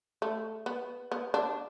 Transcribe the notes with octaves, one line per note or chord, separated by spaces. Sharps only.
A3
B3
B3
D4